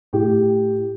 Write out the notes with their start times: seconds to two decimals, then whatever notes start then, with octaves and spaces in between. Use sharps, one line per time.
0.13 A2 G4